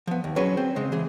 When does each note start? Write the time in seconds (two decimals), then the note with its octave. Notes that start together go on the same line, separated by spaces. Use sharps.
0.07 F3 B3
0.24 D#2
0.36 F#3 C#4 G#4 B4
0.57 C4
0.76 C#3 G#3 C4
0.92 E3 G#4